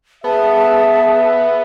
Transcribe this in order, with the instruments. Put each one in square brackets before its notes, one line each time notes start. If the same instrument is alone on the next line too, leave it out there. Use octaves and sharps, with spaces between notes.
[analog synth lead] B3 [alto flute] G#4 [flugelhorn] E5 [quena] A5